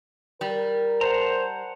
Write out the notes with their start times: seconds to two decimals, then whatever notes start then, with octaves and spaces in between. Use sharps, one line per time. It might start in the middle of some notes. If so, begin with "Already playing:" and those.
0.41 G3 A#4
1.01 C5 F#5 A5 A#5